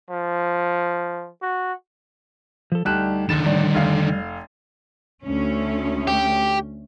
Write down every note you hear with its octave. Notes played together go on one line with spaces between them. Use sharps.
F3
F#4
F3 A4
D2 G3 D#4 G4 A5 F#6
F#1 D3 D#3 A6 E7
A1 G3 D5
F1 F5
D2 A3 C#4
G4